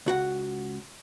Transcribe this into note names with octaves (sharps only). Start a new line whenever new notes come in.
C#2 F#4 F#5